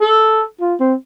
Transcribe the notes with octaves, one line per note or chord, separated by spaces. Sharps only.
A4
F4
C4